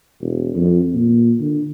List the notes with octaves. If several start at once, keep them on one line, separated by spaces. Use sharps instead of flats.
E1
F2
A#2
D3